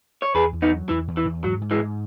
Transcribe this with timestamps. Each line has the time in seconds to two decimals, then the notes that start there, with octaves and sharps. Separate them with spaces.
0.22 C#5
0.34 E2 G#4 B4
0.53 E2
0.62 B3 D#4
0.71 F#3
0.89 E2 E3
1.08 E2
1.17 E3
1.25 E2
1.44 G#2 F#3
1.61 G#2
1.71 E3 G#3
1.79 G#2